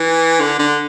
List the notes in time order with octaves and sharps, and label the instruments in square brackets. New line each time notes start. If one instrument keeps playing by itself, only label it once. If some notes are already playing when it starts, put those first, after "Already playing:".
Already playing: [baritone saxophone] E3
D3
D3